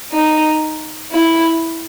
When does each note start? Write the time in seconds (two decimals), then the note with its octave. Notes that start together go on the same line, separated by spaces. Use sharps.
0.12 D#4
1.12 E4